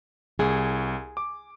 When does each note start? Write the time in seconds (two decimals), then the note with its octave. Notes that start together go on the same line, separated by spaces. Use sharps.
0.39 C2 G#4
1.17 D6